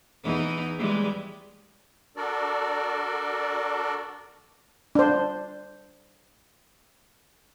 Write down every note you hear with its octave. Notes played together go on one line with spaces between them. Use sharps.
E2 E3 D#4
E3 G3 G#3
D4 F#4 A4 A#4 D5
D4 C5